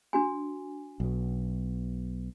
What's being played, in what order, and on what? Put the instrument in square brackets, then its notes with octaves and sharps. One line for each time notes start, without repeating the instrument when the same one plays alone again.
[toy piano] D4 F#4 G#5
[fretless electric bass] B1 B2